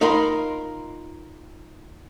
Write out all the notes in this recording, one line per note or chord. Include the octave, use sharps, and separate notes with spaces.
D#4 F4 A#4 B5 C6